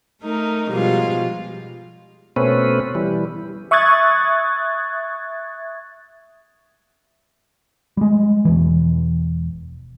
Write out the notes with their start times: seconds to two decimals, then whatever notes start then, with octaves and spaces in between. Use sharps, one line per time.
0.22 A3 D#4 A#4
0.68 B2 F3 G3 G#3 F4
2.36 B2 A3 C4 C#4 B4
2.95 E3 G3
3.71 E5 C#6 D#6 F#6 G#6 A6
7.97 G3 G#3
8.45 E1 E3